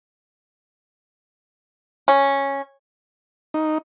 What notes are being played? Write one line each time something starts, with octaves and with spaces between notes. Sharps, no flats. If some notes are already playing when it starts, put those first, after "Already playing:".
C#4
D#4